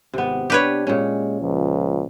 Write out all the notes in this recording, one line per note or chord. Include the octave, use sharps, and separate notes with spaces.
G#1 C3 B3
D4 G4 B4 C#5
A#2 G#3 C#4
C#2 F3